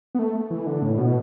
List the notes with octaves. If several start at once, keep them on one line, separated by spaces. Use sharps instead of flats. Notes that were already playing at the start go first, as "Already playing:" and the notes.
B3
A3
E3
D3
A2
B2